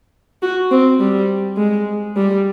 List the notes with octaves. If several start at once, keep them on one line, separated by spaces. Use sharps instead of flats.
F#4
C4
G3
G#3
G3